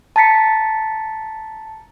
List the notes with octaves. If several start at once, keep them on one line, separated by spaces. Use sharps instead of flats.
A5 A#5 A6 B6 C#7